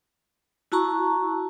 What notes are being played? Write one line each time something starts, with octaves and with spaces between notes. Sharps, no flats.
E4 F#4 A5 A#5 C#6